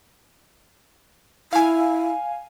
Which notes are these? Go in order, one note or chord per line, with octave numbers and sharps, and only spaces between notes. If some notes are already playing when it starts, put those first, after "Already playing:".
E4 F5 G#5